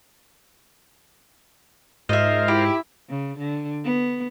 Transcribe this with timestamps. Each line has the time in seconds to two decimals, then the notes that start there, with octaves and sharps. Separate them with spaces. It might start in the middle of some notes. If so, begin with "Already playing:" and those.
2.09 G#2 F4 A#4 C5 D#5 E5
2.48 E4 G4
3.09 C#3
3.38 D3
3.84 B3